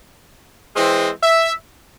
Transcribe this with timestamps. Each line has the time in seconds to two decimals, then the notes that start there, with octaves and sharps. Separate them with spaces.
0.76 E3 G#3 C4
1.23 E5